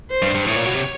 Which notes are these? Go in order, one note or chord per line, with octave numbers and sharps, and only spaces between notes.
C5
G2
G2
A2 C#5
A#2
B2
C3